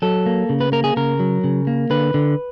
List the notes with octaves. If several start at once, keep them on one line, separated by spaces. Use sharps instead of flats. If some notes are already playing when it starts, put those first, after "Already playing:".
F#3 A4
A#3
C#3
B4
A#3 A#4
G#4
C#3 A#4
F#3
C#3
A#3
D3 B4
D3